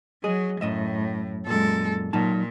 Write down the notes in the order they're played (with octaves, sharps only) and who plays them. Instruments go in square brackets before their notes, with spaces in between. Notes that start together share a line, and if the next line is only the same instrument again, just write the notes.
[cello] F#3 [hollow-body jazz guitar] G#4 D#5
[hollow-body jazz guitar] F#2 D#5 E5 [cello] A2
[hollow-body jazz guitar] F#2 A#2 [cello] G#3 A4
[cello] A#2 [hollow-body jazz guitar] F#3 D#4 A5